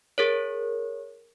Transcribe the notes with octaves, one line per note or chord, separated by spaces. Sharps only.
G#4 A#4 C#5